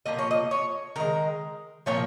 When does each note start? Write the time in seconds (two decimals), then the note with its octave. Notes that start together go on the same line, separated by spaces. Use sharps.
0.06 A#2 F3 A#3 D#5
0.18 C#5
0.31 D#5
0.51 C#5
0.96 D#3 G#3 A#4
1.86 A#2 F3 A#3 C#5